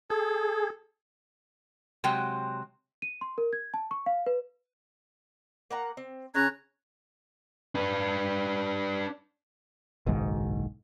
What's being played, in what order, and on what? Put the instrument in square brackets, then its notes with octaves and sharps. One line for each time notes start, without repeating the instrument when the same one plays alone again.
[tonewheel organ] G#4 [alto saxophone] A4
[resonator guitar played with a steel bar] C3 F#3 G#3 G5
[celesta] D#7
C6
A#4
G#6
A5
C#6
F5
B4
[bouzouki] A#3 F#5 A#5
C4
[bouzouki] C#3 C#5 [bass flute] C#4 [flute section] A#5 F#6 G#6
[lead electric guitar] D4 B4
[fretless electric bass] F#1 B1 G#2 D#3